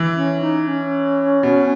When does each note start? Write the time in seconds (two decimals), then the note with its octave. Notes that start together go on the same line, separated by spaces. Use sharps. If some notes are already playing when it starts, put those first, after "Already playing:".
Already playing: E3
0.16 C#4
0.41 D#4
0.68 C#4
1.43 B2